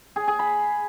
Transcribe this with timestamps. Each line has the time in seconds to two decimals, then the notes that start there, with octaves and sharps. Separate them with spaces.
0.16 G#4
0.28 G#4
0.39 B5